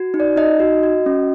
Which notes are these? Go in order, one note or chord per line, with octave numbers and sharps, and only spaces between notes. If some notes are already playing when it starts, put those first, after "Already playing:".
Already playing: F#4
D#4
D5
D#4 D#5
F#4
F#4
C#4